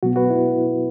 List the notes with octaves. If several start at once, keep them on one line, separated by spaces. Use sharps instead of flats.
B2 F#3 B3 F#4
F#4 B4
E4